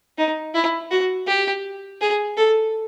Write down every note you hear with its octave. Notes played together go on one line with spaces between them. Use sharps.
D#4
E4
F#4
G4
G#4
A4